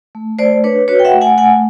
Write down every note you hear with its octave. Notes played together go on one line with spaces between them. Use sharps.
A3
A3 C5 D5
D4 B4 C#5
F#4 B4 C#5
G5
E5 F#5
A3
F#5 G#5
A3 F#5 G#5